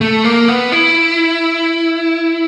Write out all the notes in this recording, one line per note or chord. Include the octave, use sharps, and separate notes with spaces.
A3
A#3
B3
E4